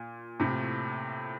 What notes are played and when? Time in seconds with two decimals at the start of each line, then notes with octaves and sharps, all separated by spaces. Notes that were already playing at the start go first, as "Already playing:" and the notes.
Already playing: A#2
0.40 A2 C3